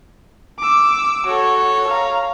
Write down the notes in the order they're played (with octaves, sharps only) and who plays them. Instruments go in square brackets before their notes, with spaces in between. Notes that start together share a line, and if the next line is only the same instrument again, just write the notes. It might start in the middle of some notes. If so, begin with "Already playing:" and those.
[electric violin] D6 E6
[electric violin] F#4 A4 [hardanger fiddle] C#5
[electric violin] F5 A#5